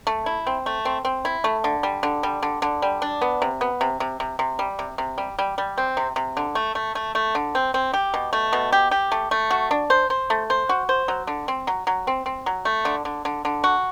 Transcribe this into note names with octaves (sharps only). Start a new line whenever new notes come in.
A3
E4
C4
A3
C4
C4
E4
A3
D3
G3
D3
G3
D3
D3
G3
D4
B3
C3
B3
C3
C3
C3
C3
G3
C3
C3
G3
G3
G3
C4
C3
C3
D3
A3
A3
A3
A3
D3
C4
C4
G4
B2
A3
B2
G4
G4
A3
A3
F#4
D4
C5
C5
A3
C5
F#4
C5
F#3
D3
C4
F#3
F#3
C4
C4
F#3
A3
D3
D3
D3
D3
F#4